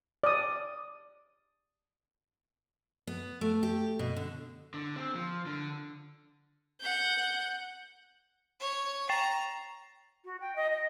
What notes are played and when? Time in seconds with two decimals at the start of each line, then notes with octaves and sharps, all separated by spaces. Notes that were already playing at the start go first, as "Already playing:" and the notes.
0.24 D5 D#6
3.07 B3
3.41 A3
3.63 G4
3.99 B2
4.16 D3
4.74 D3
4.96 C4
5.15 F3
5.46 D3
6.80 F#5 G6
8.60 C#5
9.09 G5 A#5 A6 C7
10.25 F#4
10.41 G5
10.56 D#5
10.72 D#5